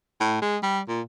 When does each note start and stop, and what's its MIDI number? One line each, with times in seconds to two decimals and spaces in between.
0.21 0.37 45
0.42 0.58 56
0.63 0.80 55
0.89 1.01 46